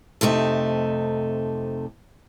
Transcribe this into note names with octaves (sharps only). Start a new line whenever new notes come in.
F2 C3 A3 D#4